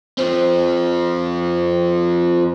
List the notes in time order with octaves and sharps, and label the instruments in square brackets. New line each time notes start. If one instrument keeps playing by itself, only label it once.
[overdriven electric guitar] F3 C4